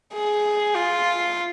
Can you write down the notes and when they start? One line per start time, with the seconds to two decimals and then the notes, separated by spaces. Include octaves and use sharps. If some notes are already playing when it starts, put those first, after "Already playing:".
0.14 G#4
0.75 F4